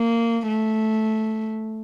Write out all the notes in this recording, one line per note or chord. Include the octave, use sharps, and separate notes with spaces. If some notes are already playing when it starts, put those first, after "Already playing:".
Already playing: A#3
A3